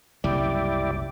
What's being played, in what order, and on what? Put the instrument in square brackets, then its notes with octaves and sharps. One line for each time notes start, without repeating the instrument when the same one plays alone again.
[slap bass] F#1 C2 G3 [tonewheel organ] E4 G4 D5